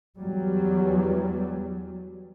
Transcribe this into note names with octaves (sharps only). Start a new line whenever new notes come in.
E2 F#3 G3